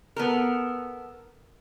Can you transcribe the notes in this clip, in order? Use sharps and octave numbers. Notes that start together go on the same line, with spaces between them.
B3 A4 A#4